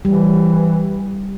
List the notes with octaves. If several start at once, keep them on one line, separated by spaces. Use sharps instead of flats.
E3 G3